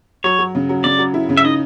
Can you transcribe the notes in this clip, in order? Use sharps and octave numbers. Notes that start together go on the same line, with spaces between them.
F#3 C#5
F#3
C#3
F#3
C#3 D5
F#3
E4
C#3
E5
D#4 D#5